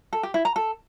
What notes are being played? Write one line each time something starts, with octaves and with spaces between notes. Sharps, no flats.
A4
G4
E4
A#5
A4